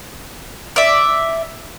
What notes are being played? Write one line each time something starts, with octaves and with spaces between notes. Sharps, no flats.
D5 E5